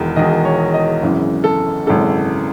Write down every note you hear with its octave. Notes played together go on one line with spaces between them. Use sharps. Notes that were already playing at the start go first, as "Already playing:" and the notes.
Already playing: E1 E2 D#3
E1 E2 D#3 D#5
C#5
D#5
G#1 F#2 C#3 E3
A4
G#1 F#2 C#3 E3 A4